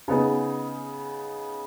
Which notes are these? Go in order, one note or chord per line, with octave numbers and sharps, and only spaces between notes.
C#3 B3 D#4 G#4